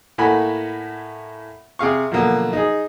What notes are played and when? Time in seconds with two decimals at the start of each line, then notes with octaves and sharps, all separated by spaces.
0.18 A2 A3 A#3 F#5 G#5 B5
1.79 C3 G#4 F5 C#6
2.11 B2 D3 F3 F#3 A#3
2.53 D#4 G#4